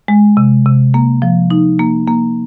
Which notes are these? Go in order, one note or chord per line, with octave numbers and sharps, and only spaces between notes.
G#3
C3
C3
A#3
F3
D#4
A#3
A#3